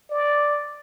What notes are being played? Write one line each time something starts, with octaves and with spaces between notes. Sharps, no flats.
D5